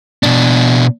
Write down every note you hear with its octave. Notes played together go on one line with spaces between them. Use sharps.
B2 D4